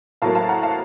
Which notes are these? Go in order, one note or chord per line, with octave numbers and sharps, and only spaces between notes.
A2 F#3 A#3 F5 A5
F5 A5
F#5 A#5
F5 A5